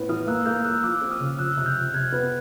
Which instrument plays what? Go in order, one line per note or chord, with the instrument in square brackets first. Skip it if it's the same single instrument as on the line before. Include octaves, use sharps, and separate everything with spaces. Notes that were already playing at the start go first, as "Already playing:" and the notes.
Already playing: [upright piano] A2 B3
[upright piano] E3 [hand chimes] D#6 F6
[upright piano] A#3 [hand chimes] E6 F#6
[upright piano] A#3 [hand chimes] F6 G6
[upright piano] A#3 [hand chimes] E6 F#6
[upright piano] F3 [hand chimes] D6 E6
[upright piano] C4
[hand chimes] D#6 F6
[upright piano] C#3
[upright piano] F2 [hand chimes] E6 F#6
[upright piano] C3 [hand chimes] F#6
[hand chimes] F6 G6
[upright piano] F2
[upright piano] C3 [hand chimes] F#6 G#6
[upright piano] B3